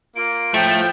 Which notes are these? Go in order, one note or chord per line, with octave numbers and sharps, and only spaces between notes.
A#3 F4 D7
A2 F3 A3 G5